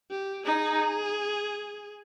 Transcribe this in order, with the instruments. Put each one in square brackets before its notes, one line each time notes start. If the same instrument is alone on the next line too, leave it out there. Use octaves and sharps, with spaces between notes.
[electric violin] G4
[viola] D#4 [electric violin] G#4